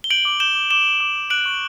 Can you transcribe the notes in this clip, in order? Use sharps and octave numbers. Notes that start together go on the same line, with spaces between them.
G7
G6 D7 F#7
D6
G6 E7 G7
D6
D6 E7 G7
D6
D6
D6
F#6 D7 F#7
C#6